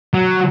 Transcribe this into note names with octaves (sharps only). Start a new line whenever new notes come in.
F#3